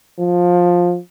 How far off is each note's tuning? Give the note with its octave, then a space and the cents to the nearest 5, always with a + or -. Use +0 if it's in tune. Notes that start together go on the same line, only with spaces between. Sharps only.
F3 +15